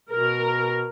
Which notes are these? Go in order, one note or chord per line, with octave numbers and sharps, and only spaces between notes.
B2 A#4